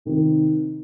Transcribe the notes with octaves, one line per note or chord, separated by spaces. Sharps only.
C3 D#3 C4 D#4